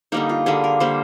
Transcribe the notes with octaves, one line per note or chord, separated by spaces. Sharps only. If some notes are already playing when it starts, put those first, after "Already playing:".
D3 G3 A#3 D#4
F4
D3 G3 A#3 G#4
A#4
D3 G3 A#3 C5